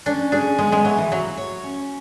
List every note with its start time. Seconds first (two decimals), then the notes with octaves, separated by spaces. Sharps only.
0.06 C#4 D4
0.32 D4 G#4
0.58 G#3 B3
0.72 G#3
0.85 F#3 E4
0.98 E3
1.12 F#3 F#4
1.38 C#5
1.63 C#4